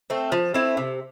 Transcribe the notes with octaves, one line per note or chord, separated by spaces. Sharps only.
A3 C4
F3
A3 C4 E4
C3